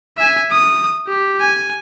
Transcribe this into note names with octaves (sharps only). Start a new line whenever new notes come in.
E5 G#5
D#6
G4
G#5